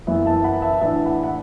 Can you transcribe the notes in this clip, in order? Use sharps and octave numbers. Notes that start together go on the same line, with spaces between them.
F#2 E3 B3 B4 E5
E5 A5
F#5 B5
E5 A5
A2 E3 D4 E5 A5
F#5 B5
F#5